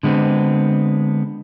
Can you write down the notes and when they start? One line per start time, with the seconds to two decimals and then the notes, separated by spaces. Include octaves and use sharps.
0.03 D3 G#3 B3 C4